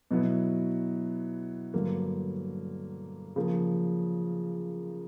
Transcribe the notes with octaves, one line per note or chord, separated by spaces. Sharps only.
B2 F#3 B3 E4
G2 D3 F#3 A#3
C#3 F3 A#3